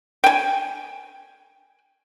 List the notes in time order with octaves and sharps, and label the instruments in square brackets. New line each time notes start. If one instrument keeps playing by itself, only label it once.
[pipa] G5 G#5